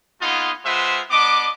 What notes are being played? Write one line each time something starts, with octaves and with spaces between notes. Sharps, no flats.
A#3 B3 D#4 F4 G#4 F#5
G#3 F4 B4 C5 E5 F#5
B3 D4 D#5 D6